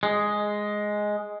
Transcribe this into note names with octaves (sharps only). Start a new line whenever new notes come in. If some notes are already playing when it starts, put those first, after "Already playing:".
G#3